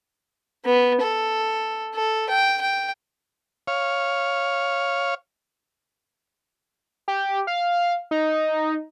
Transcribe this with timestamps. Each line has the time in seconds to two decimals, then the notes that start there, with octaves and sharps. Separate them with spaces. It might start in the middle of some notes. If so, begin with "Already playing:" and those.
0.65 B3
1.01 A4
1.95 A4
2.29 G5
2.61 G5
3.68 C#5 F5
7.08 G4
7.47 F5
8.11 D#4